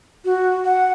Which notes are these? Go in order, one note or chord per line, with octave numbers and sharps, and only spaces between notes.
F#4
F#5